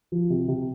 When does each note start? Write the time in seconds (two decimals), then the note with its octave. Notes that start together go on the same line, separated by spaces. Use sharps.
0.12 F3
0.30 C3
0.48 C3